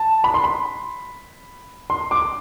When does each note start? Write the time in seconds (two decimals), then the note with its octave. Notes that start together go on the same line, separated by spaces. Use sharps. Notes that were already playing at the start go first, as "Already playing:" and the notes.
Already playing: A5
0.24 B5
0.34 C6
0.44 B5
1.90 C6
2.11 D6